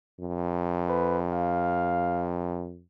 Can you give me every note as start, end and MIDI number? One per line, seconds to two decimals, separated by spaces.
0.21 2.83 41
0.89 1.19 71
1.33 2.33 77